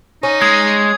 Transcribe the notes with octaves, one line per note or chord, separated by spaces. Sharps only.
C#4 D#4
G#3 D#6 G#6